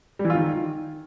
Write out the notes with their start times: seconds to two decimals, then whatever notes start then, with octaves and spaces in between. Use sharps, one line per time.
0.19 G3
0.25 E3
0.30 F4
0.35 D#3